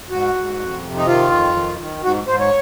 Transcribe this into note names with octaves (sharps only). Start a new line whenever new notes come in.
G#2 F#4
G#2
F2
C3
D#4
D#3 F4
F2
D#3
D#3
G#2 F#4
G#2 C5
C#5